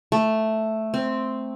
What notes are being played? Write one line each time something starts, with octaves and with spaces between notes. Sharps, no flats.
A3
C4